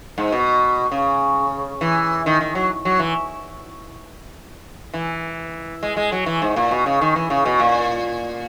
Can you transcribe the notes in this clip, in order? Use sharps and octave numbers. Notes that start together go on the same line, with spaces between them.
G#2
B2
C#3
E3
D#3
D#3
F#3
F#3
E3
E3
G#3
G#3
F#3
E3
G#2
A#2
B2
C#3
D#3
E3
C#3
B2
A#2